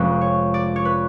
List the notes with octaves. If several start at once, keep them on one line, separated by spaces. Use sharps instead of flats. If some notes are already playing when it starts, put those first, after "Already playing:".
Already playing: F1 F2 F3 G#3 C#4 B4
C#5
D5
C#5
B4